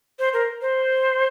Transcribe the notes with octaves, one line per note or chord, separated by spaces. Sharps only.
C5
A#4
C5